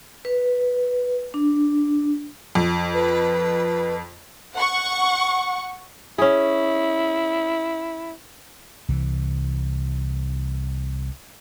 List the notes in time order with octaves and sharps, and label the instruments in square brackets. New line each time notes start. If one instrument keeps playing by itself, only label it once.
[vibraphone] B4
D4
[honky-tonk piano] F2
[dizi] B4
[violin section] F#5 C#6
[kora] C#4 G#4 [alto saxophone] E4
[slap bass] C2 E3